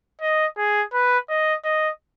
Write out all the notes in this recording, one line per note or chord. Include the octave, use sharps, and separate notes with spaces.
D#5
G#4
B4
D#5
D#5